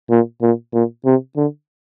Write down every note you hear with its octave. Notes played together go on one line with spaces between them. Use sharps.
A#2
A#2
A#2
C3
D3